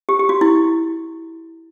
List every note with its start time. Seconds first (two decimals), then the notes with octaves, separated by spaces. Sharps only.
0.09 G4
0.19 G4
0.29 F#4
0.41 E4